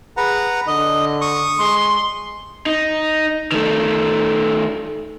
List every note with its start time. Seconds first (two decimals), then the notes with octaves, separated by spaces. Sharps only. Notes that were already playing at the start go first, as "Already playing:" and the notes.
0.17 G#4 B4 F#5 A#5
0.67 D3 D#5
1.21 C#6 D#6
1.58 G#3 C6
2.66 D#4
3.52 D#3 A3